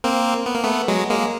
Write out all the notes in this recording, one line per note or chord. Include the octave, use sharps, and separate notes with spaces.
A#3 C4
B3
A#3
A3 B3
F#3 G#3
G#3 A#3